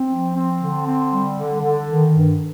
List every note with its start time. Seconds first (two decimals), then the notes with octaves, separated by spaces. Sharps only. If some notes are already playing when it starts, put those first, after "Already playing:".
Already playing: C4
0.09 F3
0.34 C4
0.59 D3
0.85 C4
1.10 G3
1.36 D3
1.61 D3
1.86 D#3
2.12 G2